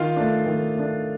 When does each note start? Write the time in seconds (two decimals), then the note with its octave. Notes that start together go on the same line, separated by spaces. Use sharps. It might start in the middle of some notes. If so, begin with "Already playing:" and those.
Already playing: D#3 F4 F5
0.16 A3 D4
0.46 D#3
0.75 A3 D4